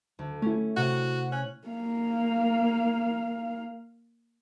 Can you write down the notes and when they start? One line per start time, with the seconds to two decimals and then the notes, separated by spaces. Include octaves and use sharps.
0.19 D2
0.42 A3 C#4 E4
0.77 C3 F#4
1.32 C#4 F#6
1.67 A#3 F5